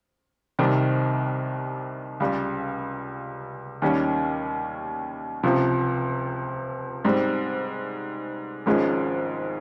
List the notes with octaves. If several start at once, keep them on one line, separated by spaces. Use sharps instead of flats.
C2 C3 D#3 G3 C4
C#2 C#3 G3
D#2 D#3 G3 C#4
C#2 C3 F3
G#2 G3 C4
G#1 G#2 F3 G#3 C#4